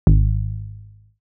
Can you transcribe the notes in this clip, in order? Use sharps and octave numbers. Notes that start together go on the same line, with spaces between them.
G#1